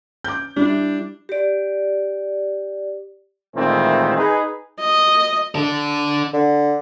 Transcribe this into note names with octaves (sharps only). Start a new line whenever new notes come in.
D6 G6
G3 D4 E4
G4 D5
A#2 D#3 E3 G#3 A3 C4
D#4 G#4 B4
D#5
D4 A4
D3